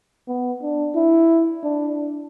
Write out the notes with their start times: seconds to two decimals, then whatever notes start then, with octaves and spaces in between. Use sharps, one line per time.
0.28 B3
0.62 D4
0.96 E4
1.64 D4